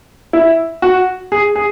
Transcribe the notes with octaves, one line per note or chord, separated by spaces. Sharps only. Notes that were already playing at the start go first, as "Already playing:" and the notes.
E4
F#4
G#4
G#4